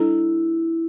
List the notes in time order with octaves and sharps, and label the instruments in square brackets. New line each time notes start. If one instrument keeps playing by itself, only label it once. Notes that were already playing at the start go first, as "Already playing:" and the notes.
Already playing: [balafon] G3 D4 A4 [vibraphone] E4